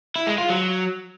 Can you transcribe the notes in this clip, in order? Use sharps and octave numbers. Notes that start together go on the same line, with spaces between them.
E4
G#3
F4
F#3